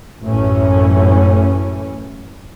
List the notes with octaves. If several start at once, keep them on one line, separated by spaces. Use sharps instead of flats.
A1 F#2 A2 E3 A3 C#4